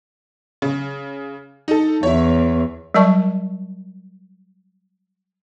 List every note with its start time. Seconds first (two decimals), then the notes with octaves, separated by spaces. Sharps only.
0.62 C#3
1.68 D#4 A4
2.03 E2 E4 C#5
2.94 F#3 G3 A#4 D5 A5 C#6